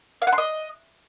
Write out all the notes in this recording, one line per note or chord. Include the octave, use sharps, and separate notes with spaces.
F5
F#5
C6
D#5